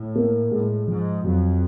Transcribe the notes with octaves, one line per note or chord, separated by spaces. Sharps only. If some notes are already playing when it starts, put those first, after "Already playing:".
Already playing: A2
A#3
A2 G#3
G#2 F3
F2 F#3